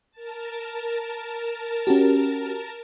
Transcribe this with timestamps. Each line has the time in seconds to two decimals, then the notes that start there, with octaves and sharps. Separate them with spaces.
0.11 A#4 A5
1.87 C#4 F#4 G4